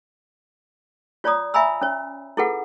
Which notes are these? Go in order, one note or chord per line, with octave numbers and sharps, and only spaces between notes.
F4 C#5 D5 A#5 D#6
E5 F5 G#5 A#5 B5 E6
C#4 C#5
E4 F4 G#4 A4 B4 F#5